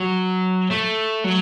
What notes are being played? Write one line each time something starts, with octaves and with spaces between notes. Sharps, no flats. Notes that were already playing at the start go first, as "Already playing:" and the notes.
Already playing: F#3
A3
F#3